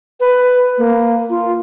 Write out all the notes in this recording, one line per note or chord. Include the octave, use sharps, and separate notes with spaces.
B4
A#3
F4